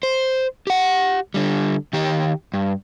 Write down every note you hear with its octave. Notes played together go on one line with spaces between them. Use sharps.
C5
G4 F#5
D3 G3
D#3 G4
G2